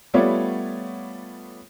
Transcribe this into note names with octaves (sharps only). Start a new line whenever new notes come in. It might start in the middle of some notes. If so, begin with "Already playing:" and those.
G3 A3 B3 F4 C#5 D5